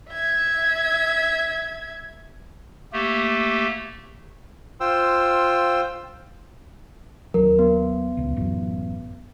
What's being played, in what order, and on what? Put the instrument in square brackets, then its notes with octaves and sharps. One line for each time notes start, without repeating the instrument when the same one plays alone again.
[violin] E5 G#6
[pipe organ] A3 A#3 G4
[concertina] F4 C5 G5 E6
[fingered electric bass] D#2 F#3 [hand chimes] A#4
[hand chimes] B3
[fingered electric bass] D#1 C#2
A1 F#2